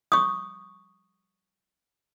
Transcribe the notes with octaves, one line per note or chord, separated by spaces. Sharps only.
C#6 D#6